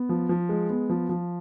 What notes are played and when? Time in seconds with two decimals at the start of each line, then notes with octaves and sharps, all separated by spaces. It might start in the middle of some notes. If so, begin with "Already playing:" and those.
Already playing: B3
0.09 F3
0.29 F3
0.49 G#3
0.70 B3
0.89 F3
1.09 F3